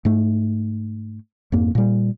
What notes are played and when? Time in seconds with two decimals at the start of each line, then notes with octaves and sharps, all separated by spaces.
0.05 G#2 A3
1.52 F2 G#2 A#3
1.75 A#2 G3